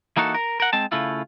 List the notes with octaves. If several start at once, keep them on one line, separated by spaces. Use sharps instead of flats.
E3 A#3 D#4 F#4 A4
A#4
A#4 F#5
G#3 C4 A5
C#3 A3 E4 F4